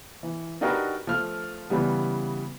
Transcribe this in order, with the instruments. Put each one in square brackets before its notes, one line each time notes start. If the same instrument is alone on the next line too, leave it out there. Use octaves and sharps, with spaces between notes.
[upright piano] E3
D4 D#4 F#4 G4 A#4 B4
F3 A3 F6
C#3 E3 G3 B3